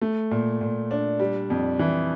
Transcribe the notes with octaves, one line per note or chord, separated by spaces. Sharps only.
A3
A#2
A#2
D4
G3
F2
E3